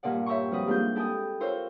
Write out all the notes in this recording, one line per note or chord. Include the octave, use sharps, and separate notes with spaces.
G2 A#2 F4 D5 F#5
C#5 E5 G5 A#5 C6 C#6
F2 G3 F#4 B4 D#5
G#2 G3 A#3 D4 F4 G6
E4 A4 G5 G#5 D#6
F4 A#4 C5 C#5 E6